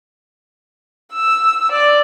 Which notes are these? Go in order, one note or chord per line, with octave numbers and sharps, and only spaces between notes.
E6
D5